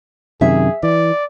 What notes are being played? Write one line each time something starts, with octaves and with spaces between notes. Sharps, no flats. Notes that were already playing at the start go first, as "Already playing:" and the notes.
F#2 C3 D#3 G#4 E5
E3 D5